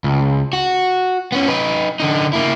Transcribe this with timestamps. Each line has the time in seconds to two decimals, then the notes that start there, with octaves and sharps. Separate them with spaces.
0.04 C#2
0.53 F#4
1.32 B3 C#4
1.48 D#4 B4
2.00 D3 D#4
2.33 A#3 E4